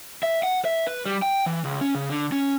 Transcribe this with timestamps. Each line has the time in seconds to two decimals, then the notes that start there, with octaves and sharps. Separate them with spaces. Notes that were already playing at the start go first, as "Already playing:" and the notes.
0.23 E5
0.43 F#5
0.65 E5
0.87 B4
1.06 G3
1.22 G5
1.46 E3
1.65 C#2
1.81 C#4
1.95 C#3
2.09 D3
2.32 C#4